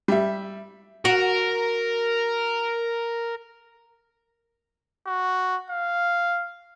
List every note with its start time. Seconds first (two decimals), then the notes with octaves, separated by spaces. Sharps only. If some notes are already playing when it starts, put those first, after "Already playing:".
0.08 G3 E5
1.05 F#4 A#4
5.07 F#4
5.70 F5